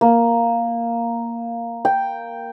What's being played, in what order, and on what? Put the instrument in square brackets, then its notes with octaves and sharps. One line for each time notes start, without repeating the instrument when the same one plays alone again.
[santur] A#3
G5